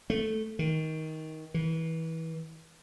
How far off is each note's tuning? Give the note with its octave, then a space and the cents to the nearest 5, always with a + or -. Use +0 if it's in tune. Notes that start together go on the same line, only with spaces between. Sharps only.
A3 -5
D#3 +20
E3 -25